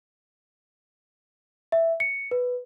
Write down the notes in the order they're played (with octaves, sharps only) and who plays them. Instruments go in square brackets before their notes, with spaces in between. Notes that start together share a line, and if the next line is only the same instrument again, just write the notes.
[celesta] E5
C#7
B4